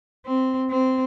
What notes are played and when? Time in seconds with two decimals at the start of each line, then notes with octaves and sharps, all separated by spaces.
0.26 C4
0.70 C4